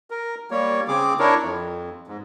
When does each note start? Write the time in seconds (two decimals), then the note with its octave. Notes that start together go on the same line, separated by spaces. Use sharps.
0.10 A#4
0.51 G3 A#3 C#5
0.88 C#3 C4 G#4 D6
1.19 D4 E4 A#4 C#5
1.43 F2
2.07 G#2